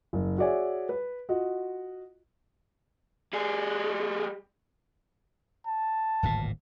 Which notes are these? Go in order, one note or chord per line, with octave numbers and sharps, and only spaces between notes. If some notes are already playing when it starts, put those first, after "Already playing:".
F#1
F#4 G#4 C#5 D5 E5 G#5
B4
F4 F#4 D#5
G3 G#4
A5
D1 G#1 A#2